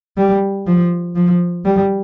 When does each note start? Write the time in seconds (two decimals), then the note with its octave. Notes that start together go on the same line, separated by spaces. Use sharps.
0.17 G3
0.66 F3
1.16 F3
1.65 G3